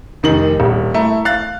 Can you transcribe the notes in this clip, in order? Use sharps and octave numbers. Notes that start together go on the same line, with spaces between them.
F1 D#3 D#4 F#7
D#1
A3 E4 A#5
F5 F#6 A6